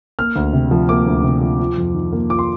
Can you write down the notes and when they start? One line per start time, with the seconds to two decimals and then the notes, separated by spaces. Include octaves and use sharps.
0.19 A#3 F6
0.36 D2
0.53 C3
0.71 F3
0.89 A#3 D6
1.06 D2
1.24 C3
1.41 F3
1.59 F4
1.78 F2
1.95 D#3
2.13 A#3
2.29 F4 D6
2.39 C6